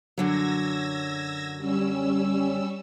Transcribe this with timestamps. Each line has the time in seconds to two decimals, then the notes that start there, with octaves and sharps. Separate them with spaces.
0.18 F#2 D3 F#3 E6 G#6 A#6
1.57 G3 C#4 E6